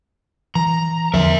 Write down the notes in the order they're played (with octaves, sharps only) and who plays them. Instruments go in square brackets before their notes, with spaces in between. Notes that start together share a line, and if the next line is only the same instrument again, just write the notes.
[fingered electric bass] E3 [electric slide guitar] A#5
[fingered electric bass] E2 D3 F3 [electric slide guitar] A#4 E5